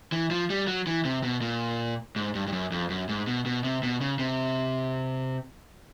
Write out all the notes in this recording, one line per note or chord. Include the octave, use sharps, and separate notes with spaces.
E3
F3
G3
F#3
E3
C3
B2
A#2
G#2
G2
G2
F#2
F2
F#2
G#2
B2
B2
C3
B2
C#3
C3